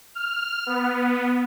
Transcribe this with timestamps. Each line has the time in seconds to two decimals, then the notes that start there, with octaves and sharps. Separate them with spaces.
0.15 F6
0.66 B3